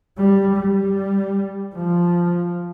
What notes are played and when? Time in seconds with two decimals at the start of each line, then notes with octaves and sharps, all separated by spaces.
0.17 G3
0.56 G3
1.75 F3